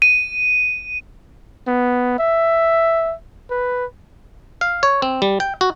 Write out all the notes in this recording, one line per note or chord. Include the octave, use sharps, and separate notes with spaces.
D#7
B3
E5
B4
F5
C#5
C4
G3
G5
F#4